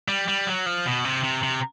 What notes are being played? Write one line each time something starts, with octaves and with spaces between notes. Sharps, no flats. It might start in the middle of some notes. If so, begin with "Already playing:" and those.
G3
G3
F#3
F3
B2
C3
C3
C3